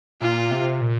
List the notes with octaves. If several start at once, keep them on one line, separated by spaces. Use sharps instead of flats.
A#2 F4
C3
A#2